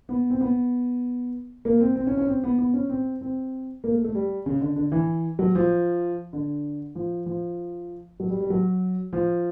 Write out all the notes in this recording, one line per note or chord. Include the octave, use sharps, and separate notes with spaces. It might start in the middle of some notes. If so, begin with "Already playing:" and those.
B3
C4
B3
A#3
C4
C4
C#4
C#4
C4
B3
B3
C#4
C4
C4
A#3
A3
A3
G3
C#3
D3
D3
E3
F#3
F3
D3
F3
F3
F#3
G3
G3
F#3
F3